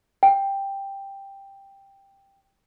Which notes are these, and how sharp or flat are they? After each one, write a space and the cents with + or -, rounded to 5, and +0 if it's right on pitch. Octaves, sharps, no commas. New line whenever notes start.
G5 +5